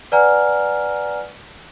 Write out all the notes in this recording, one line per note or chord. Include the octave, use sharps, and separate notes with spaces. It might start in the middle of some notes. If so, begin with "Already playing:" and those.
B4 D5 F#5 G#5 A#5 F6